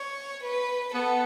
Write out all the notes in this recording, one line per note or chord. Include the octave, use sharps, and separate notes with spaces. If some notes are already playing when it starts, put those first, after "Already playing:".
Already playing: C#5
B4
B3 A4